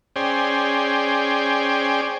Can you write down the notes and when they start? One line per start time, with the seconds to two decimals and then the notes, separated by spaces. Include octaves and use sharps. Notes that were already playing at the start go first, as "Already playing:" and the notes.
0.16 C#4 G#4 C5 D5 G5